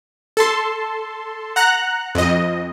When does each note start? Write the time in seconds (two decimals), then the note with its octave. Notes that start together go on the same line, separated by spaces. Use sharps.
0.37 A4 A5 C6
1.56 F#5 A#5 F#6
2.15 F2 D#5